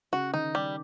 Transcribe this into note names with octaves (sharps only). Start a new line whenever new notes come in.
C#3 F#4
D#3 D#4
G3